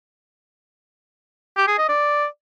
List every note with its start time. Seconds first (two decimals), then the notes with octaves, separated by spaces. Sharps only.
1.57 G4
1.68 G#4
1.78 D#5
1.89 D5